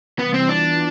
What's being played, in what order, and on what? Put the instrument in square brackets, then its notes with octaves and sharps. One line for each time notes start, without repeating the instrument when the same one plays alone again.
[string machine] C3 E3 G3 [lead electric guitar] B3
[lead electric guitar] C4
[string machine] E3 B3 F4 [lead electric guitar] D4